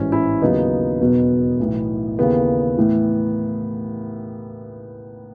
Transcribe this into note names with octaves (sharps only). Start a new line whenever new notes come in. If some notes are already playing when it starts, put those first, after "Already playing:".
Already playing: A1 G#2 E3 C#4
C#4 E4
D#2 C#3 F#3 B3 D#4
E1 E2 B2 F#3
B1 A2 E3
D#2 C#3 E3 B3
A2 E3